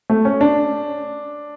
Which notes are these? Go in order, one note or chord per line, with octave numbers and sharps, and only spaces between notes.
A3
C#4
D4